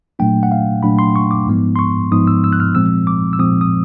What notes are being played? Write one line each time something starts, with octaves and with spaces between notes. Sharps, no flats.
A#2 F#3 A3 D4 G5
F#5
F5
A#2 F#3 A3 D4 B5
C6
C#6
D6
G#2 F3 G#3 B3 D#4
C6
C#6
G#2 F3 G#3 B3 D#4 D#6
E6
E6
F#6
F6
A#2 F3 G#3 C4 E6
D6
E6
A#2 F3 G#3 C4 D#6
D#6